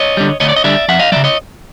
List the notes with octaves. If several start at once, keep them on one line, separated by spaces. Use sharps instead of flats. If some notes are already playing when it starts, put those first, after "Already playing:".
Already playing: C#5 D#5
D3 G3
D2 C#5 D#5
D5
D#5
D3 G3 D5 E5
F2 E5 F#5
D#5 F5
C#3 F#3 D5 E5
C#5 D#5